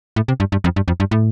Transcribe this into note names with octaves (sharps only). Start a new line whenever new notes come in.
A2
C3
G2
G2
F2
G2
F2
G2
A2